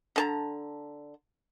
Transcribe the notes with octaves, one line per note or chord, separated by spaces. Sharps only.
D3 A5 A#5